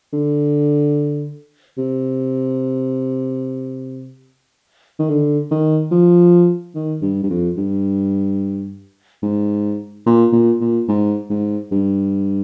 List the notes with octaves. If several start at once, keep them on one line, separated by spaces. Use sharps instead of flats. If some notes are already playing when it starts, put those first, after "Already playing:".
D3
C3
D#3
D3
D#3
F3
D#3
G2
G2
F2
G2
G#2
A#2
A#2
A#2
G#2
G#2
G2